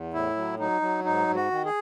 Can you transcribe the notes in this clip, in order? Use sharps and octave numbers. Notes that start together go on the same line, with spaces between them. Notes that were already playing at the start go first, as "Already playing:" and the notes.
Already playing: E2
A2 E4
F#3
F#3 D#4
F#3
G#2 D#4
G#2
F#4
D#3
G#4